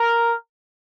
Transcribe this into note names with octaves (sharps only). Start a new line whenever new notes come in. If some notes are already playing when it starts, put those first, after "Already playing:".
Already playing: A#4